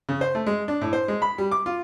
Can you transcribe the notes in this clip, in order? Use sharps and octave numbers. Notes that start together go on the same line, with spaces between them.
C#3
C5
A3
G#3
D4
A2
C5
G#3
B5
G3
D6
F4